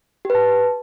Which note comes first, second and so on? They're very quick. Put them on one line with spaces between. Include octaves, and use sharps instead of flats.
G4 B4 A5